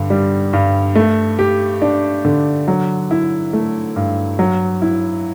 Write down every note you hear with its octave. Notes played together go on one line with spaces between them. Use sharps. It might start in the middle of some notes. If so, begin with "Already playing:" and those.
Already playing: G2 D3
G3
G2
A3
G4
D4
D3
F#3
E4
A3
G2
F#3
E4